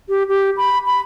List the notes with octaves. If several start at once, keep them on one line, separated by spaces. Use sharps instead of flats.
G4
G4
B5
B5